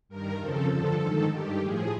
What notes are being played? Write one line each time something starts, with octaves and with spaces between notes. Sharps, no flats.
G2 D#3 A#4
F2 C#3 F3 A4
G2 D3 F3 A4
G#2 D#3
G2 D#3 G4
A2 F3 G#4